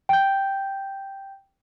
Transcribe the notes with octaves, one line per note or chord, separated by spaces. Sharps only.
G5 G6